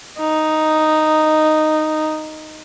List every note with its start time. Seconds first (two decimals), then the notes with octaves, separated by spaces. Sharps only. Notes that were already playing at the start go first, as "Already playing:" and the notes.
0.19 D#4